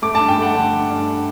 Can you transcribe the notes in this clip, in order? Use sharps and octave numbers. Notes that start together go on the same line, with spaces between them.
A3 D6
G2 A5
G5
A3
F#5
D3
D3
G2